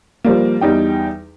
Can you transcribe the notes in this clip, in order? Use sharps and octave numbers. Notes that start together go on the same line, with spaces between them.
F3 G3 A#3
E2 G3 D#4 G5